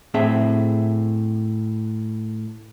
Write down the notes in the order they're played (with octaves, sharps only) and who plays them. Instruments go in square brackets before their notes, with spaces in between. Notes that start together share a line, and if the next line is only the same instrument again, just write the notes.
[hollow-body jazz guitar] A2 C4 G#4 E5